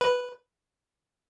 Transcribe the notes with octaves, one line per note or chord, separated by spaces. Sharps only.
B4